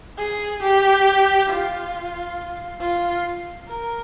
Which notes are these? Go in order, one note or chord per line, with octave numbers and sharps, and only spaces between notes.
G#4
G4
F4
F4
A#4